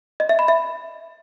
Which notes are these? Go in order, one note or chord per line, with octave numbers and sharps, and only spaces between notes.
D#5
E5
B5
E5